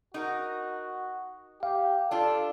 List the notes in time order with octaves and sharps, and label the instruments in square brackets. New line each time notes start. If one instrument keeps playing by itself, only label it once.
[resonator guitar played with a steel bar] D#4 A#4 [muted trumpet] F#4
[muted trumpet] G4 [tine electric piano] F5
[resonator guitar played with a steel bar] D4 F4 [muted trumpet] A4